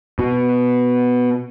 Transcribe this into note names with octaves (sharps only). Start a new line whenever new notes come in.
B2